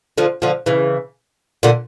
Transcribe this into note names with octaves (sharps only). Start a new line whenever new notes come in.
D3 F3
D3 F3
C#3 E3
A#2 D3